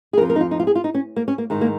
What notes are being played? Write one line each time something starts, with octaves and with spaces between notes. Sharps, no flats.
G#4
F2 F3 A#4
A#4
D#4
F4
D#4
F4
G#4
F4
D#4
C#4
A#3
C#4
A#3
G#2 D#3
A#3